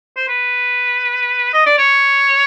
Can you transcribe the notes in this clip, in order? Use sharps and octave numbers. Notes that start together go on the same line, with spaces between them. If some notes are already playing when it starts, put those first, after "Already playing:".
C5
B4
D#5
D5
C#5